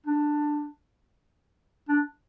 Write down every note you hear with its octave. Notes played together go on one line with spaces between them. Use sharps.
D4
D4